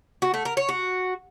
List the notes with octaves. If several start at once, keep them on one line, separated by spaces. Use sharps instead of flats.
F#4
A3
A#4
C#5
F#4